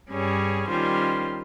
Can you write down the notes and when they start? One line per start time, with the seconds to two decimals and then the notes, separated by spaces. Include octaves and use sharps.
0.11 G2 G3 C#4 G#4 C#5
0.68 D#3 G3 C#4 F4 C5